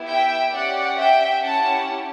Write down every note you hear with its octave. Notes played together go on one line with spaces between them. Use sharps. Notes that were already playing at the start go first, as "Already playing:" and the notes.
Already playing: B3 E4 G4
E5 G5
C#4 G4 D5 F#5
E5 G5
C#4 E4 G4 F#5 A5